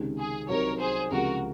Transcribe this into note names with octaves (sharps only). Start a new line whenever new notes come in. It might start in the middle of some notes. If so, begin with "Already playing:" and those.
Already playing: C#2 C3 D#3 G#3
G#4
C2 C3 F#3 C4 D#4 A#4 C#5
G#4 C5
C#2 C3 F3 G#3 F#4 A#4